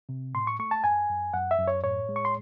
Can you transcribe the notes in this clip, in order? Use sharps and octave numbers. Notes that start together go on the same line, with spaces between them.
C3
A2 C6
C#6
A3 C#6
A5
F#2 G#5
F#2
F#2 F#5
E5
F#2
C#5
A2 C#5
G#3
C#6
C6